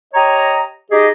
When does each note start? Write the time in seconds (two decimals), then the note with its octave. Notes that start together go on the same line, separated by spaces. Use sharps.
0.14 G4 C#5 D#5 A#5
0.91 D#4 G4 G#4 D#5